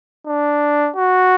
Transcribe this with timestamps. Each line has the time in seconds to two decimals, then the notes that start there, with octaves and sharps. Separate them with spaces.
0.27 D4
0.96 F#4